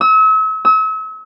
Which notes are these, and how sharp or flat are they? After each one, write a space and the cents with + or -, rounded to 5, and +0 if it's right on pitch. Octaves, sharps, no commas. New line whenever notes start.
E6 -40
E6 -40